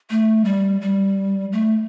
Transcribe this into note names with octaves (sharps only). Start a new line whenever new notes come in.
A3
G3
G3
A3